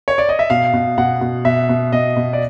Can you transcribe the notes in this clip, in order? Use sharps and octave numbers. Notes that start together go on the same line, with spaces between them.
C#5
D5
D#5
E5
B2 F5
B2
B2 F#5
B2
B2 E5
B2
B2 D#5
B2
D5